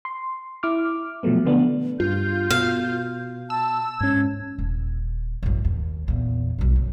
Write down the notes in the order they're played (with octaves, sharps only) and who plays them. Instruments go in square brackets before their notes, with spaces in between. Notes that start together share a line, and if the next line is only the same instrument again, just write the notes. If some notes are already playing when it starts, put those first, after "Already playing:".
[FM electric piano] C6
E4 D6 F6
B2 F3 F#3 A3 B3
D3 F3 A3 B3 D4
[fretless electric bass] G2 [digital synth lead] F4 [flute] G6
[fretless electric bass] B2 [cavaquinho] F5
[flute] A5 [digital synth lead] E6
[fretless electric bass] G#2 C#4 [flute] G#6
[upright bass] D#1
A1 F#2
D#2
E2 A#2
B1 G3
F#2